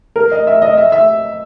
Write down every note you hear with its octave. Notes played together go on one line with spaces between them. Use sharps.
A#4
D#5
E5
D#5
E5
E5